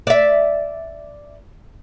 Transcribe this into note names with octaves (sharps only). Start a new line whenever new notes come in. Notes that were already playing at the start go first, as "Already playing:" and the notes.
D5 E5